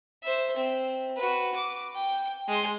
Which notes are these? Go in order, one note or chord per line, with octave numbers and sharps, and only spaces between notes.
C5 E5
C4
F#4 B4
D6
G5
G#3 C6